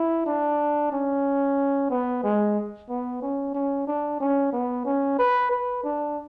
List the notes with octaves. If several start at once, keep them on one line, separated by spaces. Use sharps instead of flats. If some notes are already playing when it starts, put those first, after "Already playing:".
Already playing: E4
D4
C#4
B3
G#3
B3
C#4
C#4
D4
C#4
B3
C#4
B4
B4
D4